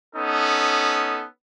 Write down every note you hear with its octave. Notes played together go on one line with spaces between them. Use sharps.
B3 C#4 D#4 A4